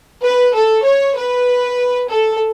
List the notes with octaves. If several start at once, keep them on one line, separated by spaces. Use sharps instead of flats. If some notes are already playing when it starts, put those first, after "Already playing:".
B4
A4
C#5
B4
A4